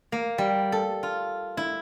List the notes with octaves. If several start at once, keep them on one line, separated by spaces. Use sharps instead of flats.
A#3
G3
A4
F4
E4